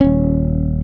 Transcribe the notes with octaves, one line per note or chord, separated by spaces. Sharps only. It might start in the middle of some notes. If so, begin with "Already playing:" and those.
D#1 C#4